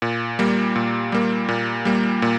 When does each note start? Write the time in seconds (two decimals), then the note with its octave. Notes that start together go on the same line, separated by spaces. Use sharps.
0.02 A#2
0.39 G3 A#3
0.76 A#2
1.12 G3 A#3
1.49 A#2
1.85 G3 A#3
2.22 A#2